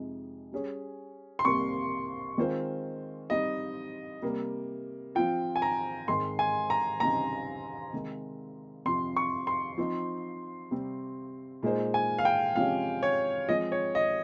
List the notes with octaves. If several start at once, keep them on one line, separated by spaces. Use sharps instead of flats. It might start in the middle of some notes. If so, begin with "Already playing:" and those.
Already playing: F2 C3 F3 G#3 D#4
G3 C#4 G#4 C#5
C6
C2 C3 G3 A#3 C#6
D#3 G#3 C4 F4 C5
G3 C4 D#4 D#5
C3 G3 A#3
F3 C4 F4 G5
G#5
A#5
G#2 D#3 G#3 C4 C6
G#5
A#5
C#2 C3 G3 C4 D#4 A#5
C3 D#3 G#3
F2 C3 F3 C6
C#6
C6
F3 C4 D#4
C3 G3 C4
A#2 G#3 D#4 G#4 C5
G#5
F5
G5
C3 F3 G#3 C#4 G4 F5
C#5
F3 G#3 C4 D#5
C#5
D#5